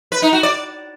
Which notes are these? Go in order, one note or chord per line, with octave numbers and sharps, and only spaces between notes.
B4
D#4
F#4
D5